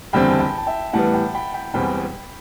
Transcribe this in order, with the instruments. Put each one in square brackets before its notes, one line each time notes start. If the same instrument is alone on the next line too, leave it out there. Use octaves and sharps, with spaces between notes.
[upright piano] F#1 E2 D3 G3 C4 [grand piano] G5 B5
[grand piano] A5
G5 B5
A5
E5 G5
[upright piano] A2 E3 G3 B3 [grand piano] F#5 A5
[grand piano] G5 B5
G5 B5
G5 B5
[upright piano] E1 E2 B2 G3 C4 [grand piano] G5 B5